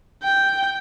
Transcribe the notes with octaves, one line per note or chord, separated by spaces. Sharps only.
G5